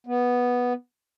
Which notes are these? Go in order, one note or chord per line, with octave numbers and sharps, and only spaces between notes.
B3